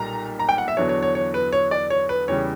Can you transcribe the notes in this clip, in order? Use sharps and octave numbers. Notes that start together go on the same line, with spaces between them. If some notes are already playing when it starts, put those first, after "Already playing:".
Already playing: B1 A#2 G3 A#5
A#5
G5
F#5
E5
E2 D3 F#3 B3 D4 C#5
C#5
C#5
C#5
B4
C#5
D5
C#5
B4
E2 C#3 G3 C#5